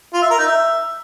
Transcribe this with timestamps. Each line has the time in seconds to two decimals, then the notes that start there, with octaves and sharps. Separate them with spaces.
0.13 F4
0.22 E5
0.30 A#4
0.38 D#4
0.46 E5